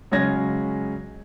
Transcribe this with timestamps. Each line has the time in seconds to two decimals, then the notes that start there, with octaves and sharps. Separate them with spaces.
0.12 C#3 F#3 G#3 C#4 G#6 A#6